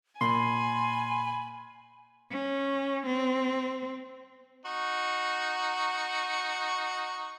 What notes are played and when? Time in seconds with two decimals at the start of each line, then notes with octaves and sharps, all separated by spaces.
0.21 A#2 G#5 B5 C6
2.30 C#4
3.06 C4
4.65 D#4 F#4 C#6